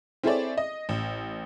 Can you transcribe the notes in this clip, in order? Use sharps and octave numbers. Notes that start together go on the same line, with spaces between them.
C4 E4 G#4 A4 C#5 D5
D#5
A1